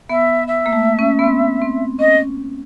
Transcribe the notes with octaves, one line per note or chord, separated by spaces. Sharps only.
B3 E5
E5
A#3
A3
C#4
B3
C4
C4
C#4 D#5